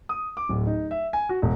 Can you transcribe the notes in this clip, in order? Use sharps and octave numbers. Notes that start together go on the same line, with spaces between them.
D#6
D6
D1
D#4
E5
G#5
F#4
E1